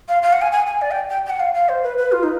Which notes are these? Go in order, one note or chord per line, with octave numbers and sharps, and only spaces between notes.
F5
F5
F#5
G#5
G#5
G#5
D5
G5
G5
G5
F#5
F5
F5
C5
B4
B4
F4
D#4